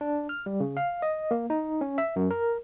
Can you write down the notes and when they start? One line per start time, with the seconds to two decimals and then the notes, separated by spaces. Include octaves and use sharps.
0.01 D4
0.29 F6
0.46 G3
0.60 C#3
0.77 F5
1.02 D#5
1.31 A#3
1.50 D#4
1.81 C#4
1.98 E5
2.16 F#2
2.31 A#4